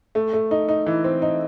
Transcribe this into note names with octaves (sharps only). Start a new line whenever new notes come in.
A3
A3
D#4
D#4
E3
C4
D#4